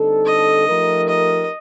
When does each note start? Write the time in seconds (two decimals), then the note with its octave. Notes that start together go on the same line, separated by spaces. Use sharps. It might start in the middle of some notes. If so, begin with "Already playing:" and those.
Already playing: D3 G3 C4 D#4 A4
0.26 D#5
0.67 F3 A3 D#4 G4 A#4
1.09 D#5